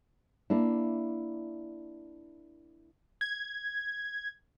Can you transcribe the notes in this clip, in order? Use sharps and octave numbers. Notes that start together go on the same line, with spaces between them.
A#3 D4 E4
G#6